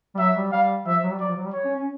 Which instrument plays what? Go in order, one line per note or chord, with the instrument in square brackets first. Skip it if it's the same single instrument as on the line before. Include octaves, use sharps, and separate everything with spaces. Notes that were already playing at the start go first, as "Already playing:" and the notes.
[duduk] G3
[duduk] F#3 [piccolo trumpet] E5
[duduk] G3
[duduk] G3 [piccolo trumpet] F5
[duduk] F3 [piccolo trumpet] E5
[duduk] F#3
G3
[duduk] F#3 [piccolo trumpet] D5
[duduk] F3
F#3
G3
[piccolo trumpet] C#5
[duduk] C#4
C#4